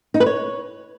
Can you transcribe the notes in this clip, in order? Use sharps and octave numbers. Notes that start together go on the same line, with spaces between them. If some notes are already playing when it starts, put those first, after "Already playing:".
D#4
B4
C#5